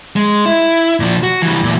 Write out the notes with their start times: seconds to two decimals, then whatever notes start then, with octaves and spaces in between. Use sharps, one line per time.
0.16 G#3
0.45 E4
1.00 A#2 F3
1.23 F#4
1.42 E3 G3
1.64 A#2 E3